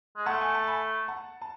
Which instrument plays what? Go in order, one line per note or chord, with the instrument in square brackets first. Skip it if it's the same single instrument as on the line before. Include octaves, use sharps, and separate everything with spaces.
[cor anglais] G#3
[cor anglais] A3 [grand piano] F#5 A5
[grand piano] G#5
A5
G#5 B5
F#5 A5
A5